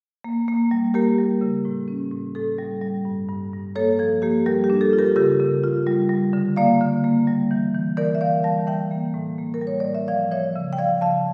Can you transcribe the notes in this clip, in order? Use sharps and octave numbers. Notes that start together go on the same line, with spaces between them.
A#3
A#3
G3
A#3 G4 A#4
G3
C#3
A2
C#4
A2
A2 A4
G3
G3
G2
G2
G2
A#3 A4 C#5
F3 A4
A#3 G4
G3 G4 A#4
G4
D4
A4
F4
G4 A#4
C#3 G4 A#4
C#3
F4
G3
G3
D3
A#3 D5 F5
D3
A#3
G3
E3
E3
E3 A#4 D5
E5
E3 D5 F5
G3 F5 A5
E3 E5 G5
A#3
A2
A#3
A#4
G3
C#5
A2 D5
E5
F3 D5 F5
F3 C#5 E5
C#3
G5
F3 D5 F5
C#3 F5 A5